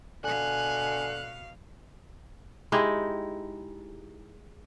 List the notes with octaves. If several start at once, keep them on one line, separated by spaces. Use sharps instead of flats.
B2 D3 F5 G#5 F#6
G#3 D#4 E4 G4